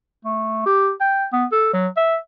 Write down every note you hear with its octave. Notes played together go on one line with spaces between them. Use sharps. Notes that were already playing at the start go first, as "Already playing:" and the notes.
A3
G4
G5
B3
A4
F#3
E5